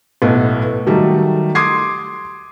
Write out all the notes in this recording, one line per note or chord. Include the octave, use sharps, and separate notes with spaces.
B1 A2 B3
D#3 F#3 G3 A3
C6 D6 D#6 G#6 C7